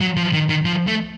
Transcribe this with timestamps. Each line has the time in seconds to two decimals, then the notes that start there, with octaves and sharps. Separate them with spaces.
0.01 F#3
0.17 F3
0.33 D#3
0.49 D#3
0.65 F3
0.87 A3